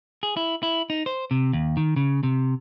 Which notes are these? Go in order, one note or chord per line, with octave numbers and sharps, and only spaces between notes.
G#4
E4
E4
D#4
C5
C3
D#2
D#3
C#3
C3